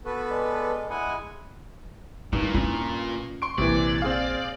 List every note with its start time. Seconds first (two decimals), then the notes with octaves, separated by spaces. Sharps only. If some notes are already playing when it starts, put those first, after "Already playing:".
0.05 B3 F#4 A4 B4
0.30 G#3 D4
0.90 G#3 E4 D#5 F#5 G#5
2.33 G2 A#2 D#4
2.54 C#4 F4
3.42 C6 C#6 D7
3.58 A#1 C3 E3 D5
4.02 C4 G#4 F5